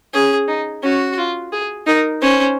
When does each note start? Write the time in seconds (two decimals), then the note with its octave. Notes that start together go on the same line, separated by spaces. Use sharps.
0.14 C#4 G#4
0.48 D#4
0.83 C#4 F#4
1.18 F4
1.53 G#4
1.87 D#4 A#4
2.22 C#4 C5